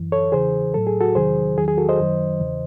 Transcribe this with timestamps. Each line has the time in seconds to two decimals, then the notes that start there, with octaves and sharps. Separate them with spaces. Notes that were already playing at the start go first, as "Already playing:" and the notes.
Already playing: F#2 E3
0.12 A4 C#5
0.32 E2 C#3 E3 G#4 C5
0.74 A2 F#3 A4
0.87 G#4
1.01 F#4 A4
1.15 E2 C3 D#3 F#3 G#4 C5
1.57 E2 D#3 F#3 G#4
1.68 G#4
1.77 F#4 A4
1.89 C5 D#5
1.98 F#2 D#3 F#3
2.40 E2 C#3 E3